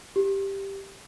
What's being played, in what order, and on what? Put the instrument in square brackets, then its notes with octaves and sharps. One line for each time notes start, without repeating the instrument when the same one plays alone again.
[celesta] G4